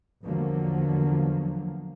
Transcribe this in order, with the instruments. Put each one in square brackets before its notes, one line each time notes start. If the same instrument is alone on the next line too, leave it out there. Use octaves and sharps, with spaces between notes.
[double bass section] E2 D3 F3 F#3 A#3